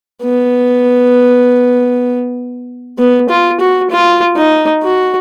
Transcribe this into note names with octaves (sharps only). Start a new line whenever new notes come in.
B3
B3
F4
F#4
F4
D#4
F#4